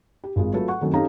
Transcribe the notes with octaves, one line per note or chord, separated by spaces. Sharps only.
G4
G#1 G#3 F4
F#3 A3 F4 A4 B4
F#5 C#6
F#2 D#3 A3 C4
C#4 D#4 G4 A4 F5 A#5